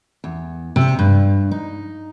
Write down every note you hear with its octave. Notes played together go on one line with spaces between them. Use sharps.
E2
C3
G2
D#4